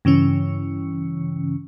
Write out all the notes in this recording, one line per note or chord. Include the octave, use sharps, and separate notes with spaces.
G2 C#3 E3 C#4